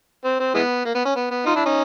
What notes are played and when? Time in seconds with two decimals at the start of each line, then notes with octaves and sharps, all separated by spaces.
0.25 C4
0.40 C4
0.54 E3 G#3 B3
0.85 A#3
0.95 B3
1.05 C#4
1.16 B3
1.31 B3
1.46 D#4 F4
1.55 D4 E4
1.65 C#4 D#4